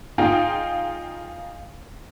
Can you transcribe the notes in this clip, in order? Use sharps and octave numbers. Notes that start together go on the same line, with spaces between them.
D#4 F4 G#4 F5 G5